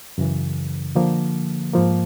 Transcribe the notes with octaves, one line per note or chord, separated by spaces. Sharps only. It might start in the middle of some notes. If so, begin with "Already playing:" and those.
F#2 C#3 E3
D3 F3 A#3
G#2 F3 A#3